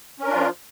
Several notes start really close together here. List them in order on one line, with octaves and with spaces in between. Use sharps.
C#4 A#4 D4 F4 F3